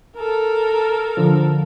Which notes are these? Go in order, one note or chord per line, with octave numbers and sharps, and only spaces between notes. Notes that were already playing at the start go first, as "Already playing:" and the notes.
A4 A#4
D3 F3